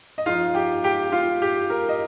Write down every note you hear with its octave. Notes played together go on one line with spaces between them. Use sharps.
D#5
F3 D#4 F4 F5
G4 G5
G4 G5
F4 F5
G4
A#4
D#5